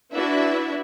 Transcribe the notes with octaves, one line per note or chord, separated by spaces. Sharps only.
D4 E4 F#4 B4 E5